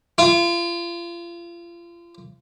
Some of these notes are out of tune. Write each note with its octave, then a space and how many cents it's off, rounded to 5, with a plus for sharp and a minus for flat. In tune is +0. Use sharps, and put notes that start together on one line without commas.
F4 -35